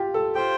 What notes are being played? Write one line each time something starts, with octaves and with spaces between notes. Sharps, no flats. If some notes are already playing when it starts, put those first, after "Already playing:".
Already playing: F4 G4
A4
F4 G4 C5 G5